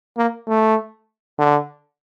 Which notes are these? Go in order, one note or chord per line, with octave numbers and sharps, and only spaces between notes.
A#3
A3
D3